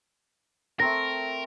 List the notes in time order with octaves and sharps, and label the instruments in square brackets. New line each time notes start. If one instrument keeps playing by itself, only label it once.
[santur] A3 C4 A#5 [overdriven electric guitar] A#4 [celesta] A#6